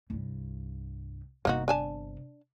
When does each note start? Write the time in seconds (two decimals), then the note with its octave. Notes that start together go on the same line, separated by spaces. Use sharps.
0.10 C2 G2
1.45 G1 C3 A#3 D#4 F#4
1.68 D4 G#5 A5